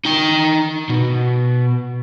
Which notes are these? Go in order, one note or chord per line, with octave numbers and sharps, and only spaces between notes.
D#4 G5
B2